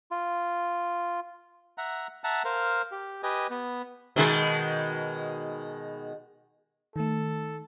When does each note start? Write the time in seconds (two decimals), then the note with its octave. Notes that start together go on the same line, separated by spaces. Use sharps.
0.11 F4
1.78 E5 F#5 A#5
2.24 E5 F#5 A5 A#5
2.45 A#4 C5 F5
2.92 G4
3.23 G4 B4 D#5 G#5
3.50 B3
4.16 B2 D#3 G#3
6.96 D#3 A3 A4